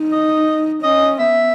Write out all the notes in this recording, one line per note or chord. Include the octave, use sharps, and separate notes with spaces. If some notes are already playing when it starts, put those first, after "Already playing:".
Already playing: D#4
D#5
C#4 D#5
B3 E5